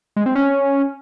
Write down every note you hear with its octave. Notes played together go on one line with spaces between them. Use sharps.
G#3
C4
C#4